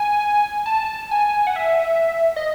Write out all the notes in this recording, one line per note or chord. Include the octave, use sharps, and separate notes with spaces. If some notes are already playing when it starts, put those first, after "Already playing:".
Already playing: G#5
A5
G#5
F#5
E5
D#5